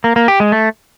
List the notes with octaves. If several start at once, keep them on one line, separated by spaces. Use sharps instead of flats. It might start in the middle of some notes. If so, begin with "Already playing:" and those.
A#3
A#3
G4
G#3
A3